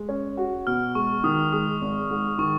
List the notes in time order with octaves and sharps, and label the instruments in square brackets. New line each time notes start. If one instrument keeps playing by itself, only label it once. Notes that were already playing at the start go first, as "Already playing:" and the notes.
Already playing: [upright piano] G#3
C#4
F#4
[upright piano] B2 [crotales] F6
[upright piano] G#3 [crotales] C#6
[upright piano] D#3 [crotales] D#6
[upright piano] G#3 [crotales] D#6
[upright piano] G#1
G#2
[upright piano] D#3 [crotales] C#6